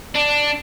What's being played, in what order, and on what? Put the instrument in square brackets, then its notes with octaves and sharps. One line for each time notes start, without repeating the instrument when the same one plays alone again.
[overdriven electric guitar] D4